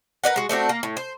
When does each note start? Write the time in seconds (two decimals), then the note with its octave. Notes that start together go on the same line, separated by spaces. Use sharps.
0.24 A#4 B4 D5 F#5
0.36 G#3 F#4
0.49 A3 C4 D4 F#4
0.69 A#3
0.83 A2
0.97 C5